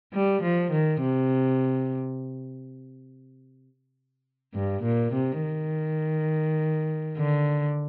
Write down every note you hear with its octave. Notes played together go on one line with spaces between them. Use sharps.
G3
F3
D#3
C3
G2
A#2
C3
D#3
D3